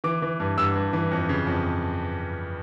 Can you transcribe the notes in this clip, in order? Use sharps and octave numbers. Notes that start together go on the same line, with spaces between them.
E3 D6
E3
G2
G2 E6
G2
E3
F2
C#3
F2